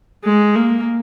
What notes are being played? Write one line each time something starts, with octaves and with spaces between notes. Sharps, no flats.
G#3
A#3